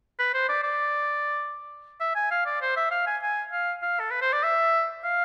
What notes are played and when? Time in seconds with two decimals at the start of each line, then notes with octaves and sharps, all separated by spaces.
0.19 B4
0.34 C5
0.49 D5
0.64 D5
2.01 E5
2.16 G#5
2.31 F5
2.46 D5
2.62 C5
2.77 E5
2.91 F5
3.07 G#5
3.23 G#5
3.52 F5
3.83 F5
4.00 A4
4.11 B4
4.22 C5
4.33 D5
4.44 E5
5.04 F5